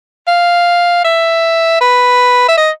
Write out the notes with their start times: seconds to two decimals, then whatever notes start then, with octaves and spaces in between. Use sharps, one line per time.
0.27 F5
1.04 E5
1.81 B4
2.48 E5
2.57 D#5